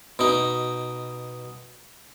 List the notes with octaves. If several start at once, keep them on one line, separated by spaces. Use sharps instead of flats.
B2 D#4